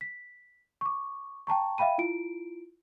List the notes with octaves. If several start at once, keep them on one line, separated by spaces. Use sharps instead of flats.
B6
C#6 D6
G5 A5 A#5 C#6
E5 F5 G5 B5 D#7
E4 F4 D7